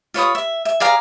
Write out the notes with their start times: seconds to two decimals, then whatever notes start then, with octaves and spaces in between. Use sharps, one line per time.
0.14 F4 C#5 B5 D#6
0.35 E5
0.65 E5
0.80 G#4 D5 F5 A#5